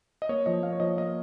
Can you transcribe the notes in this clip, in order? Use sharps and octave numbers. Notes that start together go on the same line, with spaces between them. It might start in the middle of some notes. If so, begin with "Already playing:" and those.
D#5
A#3 C#5
F3 D#5
A#3 F5
C#5
F3 D#5
A#3 D#5